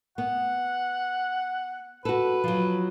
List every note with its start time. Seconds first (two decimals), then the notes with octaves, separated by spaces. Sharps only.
0.18 B3 F#5
2.05 F#4 A4 B4
2.44 F3 F#3